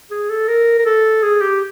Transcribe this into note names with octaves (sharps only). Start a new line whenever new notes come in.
G#4
A4
A#4
A#4
A4
G#4
G4